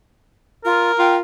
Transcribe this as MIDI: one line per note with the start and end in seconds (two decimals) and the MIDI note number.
0.64 0.91 65
0.64 1.20 70
0.98 1.21 65
0.98 1.16 79